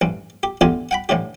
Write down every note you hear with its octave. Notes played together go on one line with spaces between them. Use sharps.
A1 G2
G4
A1 E2 D3 F4 G4 G#5
F#5 G5 B5
A1 A2 D3 G4